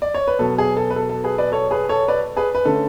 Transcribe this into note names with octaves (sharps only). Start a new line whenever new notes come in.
D5
C#5
B4
B2 F#3 B3 A4
G#4
A4
B4
A4
A4
G#4 B4
B4 D5
A4 C#5
G#4 B4
A4 C#5
B4 D5
G#4 B4
B4
D3 A3 C#4 A4